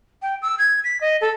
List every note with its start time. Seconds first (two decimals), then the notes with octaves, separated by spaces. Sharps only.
0.22 G5
0.42 E6
0.59 G#6
0.84 B6
1.01 D#5
1.21 A4